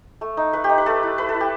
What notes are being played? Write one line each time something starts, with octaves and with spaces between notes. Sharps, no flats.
A3
D#4
A3 B4
G4
D#4
B4
A3 A4
E4
A3 B4
A4
E4
G4